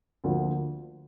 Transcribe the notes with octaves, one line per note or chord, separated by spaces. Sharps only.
D2 D3 F3 A#3